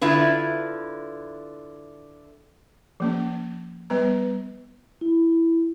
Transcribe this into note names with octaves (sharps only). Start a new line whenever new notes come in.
D3 E4 F4 B4
F3 A#3 C#4
G3 B3 B4 A#5
E4